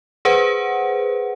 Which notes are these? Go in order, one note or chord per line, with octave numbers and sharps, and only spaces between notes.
G#4 B4 C5 F#5